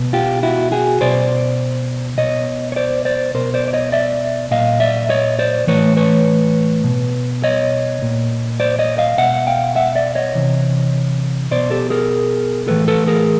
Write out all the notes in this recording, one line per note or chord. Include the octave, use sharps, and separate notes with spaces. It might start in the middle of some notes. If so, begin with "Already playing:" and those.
Already playing: B2
F4 G4
E4 F#4
F#4 G#4
B2 C5 D5
B2 C#5 D#5
C#5
C5 D5
C5 D5
B2 A#4 C5
C5 D5
D5
C#5 D#5
D5 E5
A#2 D#5 F5
D5 E5
C#5 D#5
C5 D5
A2 E3 B4 C#5
B4 C#5
B2
C#5 D#5
A#2
C5 D5
C#5 D#5
D#5 F5
B2 E5 F#5
F5 G5
E5 F#5
D5 E5
C#5 D#5
C3 E3
B2 C5 D5
G4 A4
G#4 A#4
A2 E3 A4 B4
A4 B4
G#4 A#4